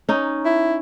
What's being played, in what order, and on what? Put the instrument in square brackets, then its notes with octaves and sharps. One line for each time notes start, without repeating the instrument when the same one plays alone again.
[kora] C#4 D#4
[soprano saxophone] E4